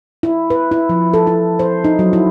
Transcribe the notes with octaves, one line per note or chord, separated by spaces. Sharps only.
E4
B4
E4
F3
A4
E4
C5
D#4
F#3
E4